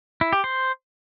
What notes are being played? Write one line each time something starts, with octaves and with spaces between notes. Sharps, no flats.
E4
G4
C5